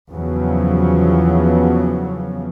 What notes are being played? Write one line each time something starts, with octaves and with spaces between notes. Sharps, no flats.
E2 C#3 F3 F#3